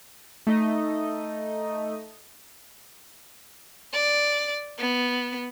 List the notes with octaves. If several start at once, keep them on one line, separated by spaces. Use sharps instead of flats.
A3 D#4 D#5
D5
B3